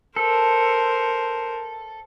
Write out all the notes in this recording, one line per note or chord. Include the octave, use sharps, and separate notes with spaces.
A4 A#4 C5